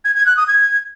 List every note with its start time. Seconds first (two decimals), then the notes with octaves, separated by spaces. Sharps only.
0.04 G#6
0.15 G#6
0.26 F#6
0.37 D#6
0.47 G#6